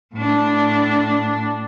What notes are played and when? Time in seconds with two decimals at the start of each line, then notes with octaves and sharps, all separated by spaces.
0.15 A2 D4